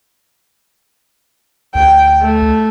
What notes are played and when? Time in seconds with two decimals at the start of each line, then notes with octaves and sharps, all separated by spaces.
1.75 D2 G5
2.22 A3